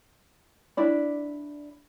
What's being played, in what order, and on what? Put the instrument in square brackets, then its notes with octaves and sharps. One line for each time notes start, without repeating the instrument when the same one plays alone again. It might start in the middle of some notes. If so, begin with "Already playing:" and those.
[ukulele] D4 E4 D5